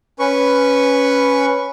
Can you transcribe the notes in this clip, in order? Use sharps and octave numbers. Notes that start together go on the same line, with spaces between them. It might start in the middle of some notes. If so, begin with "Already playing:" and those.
C#4 B4 C#6